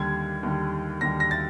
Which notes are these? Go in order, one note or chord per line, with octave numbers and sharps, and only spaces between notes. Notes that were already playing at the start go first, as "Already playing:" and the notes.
Already playing: D#2 D3 G3 G#6
D#2 D3 G3
D#2 D3 G3 A#6
A#6
A6